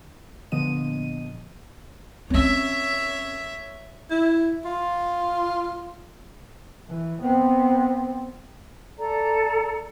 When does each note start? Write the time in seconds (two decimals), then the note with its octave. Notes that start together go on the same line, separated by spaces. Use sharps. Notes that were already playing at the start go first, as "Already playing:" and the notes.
0.52 A#2 D3 F3 B3 D#5 D#7
2.30 C4 C#4 C#5 E5
4.11 E4
4.65 F4
6.89 E3
7.22 B3 C4
8.98 A4 D5 A#5